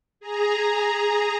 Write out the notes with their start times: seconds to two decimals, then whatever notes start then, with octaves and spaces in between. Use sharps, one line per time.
0.20 G#4 A#5